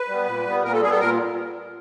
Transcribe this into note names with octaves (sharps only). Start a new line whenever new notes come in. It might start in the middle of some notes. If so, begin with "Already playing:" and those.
Already playing: B4
G3 B3
A#2
G3 B3
A#2 A#4
A4
G3 B3 G#4
A4
A#2 A#4